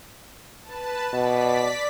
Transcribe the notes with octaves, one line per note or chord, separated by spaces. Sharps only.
B4 A5
B2 D5 B6